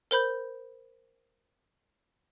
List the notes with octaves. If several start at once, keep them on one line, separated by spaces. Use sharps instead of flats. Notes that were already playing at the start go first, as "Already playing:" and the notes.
A#4 C5 B5 G6